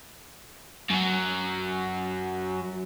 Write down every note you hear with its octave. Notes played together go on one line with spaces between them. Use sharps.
F#2 F#3